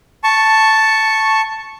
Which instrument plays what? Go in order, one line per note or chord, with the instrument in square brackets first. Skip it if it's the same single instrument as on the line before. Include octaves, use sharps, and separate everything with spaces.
[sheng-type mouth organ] A5 C#6